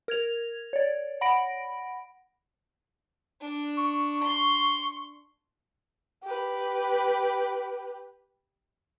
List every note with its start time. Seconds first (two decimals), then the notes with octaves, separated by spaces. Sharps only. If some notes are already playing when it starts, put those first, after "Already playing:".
0.08 A#4 G#6 F7
0.73 C#5 D5
1.21 F#5 B5 A#6 D7
3.41 D4
3.77 C#6
4.23 C6
6.23 G4 B4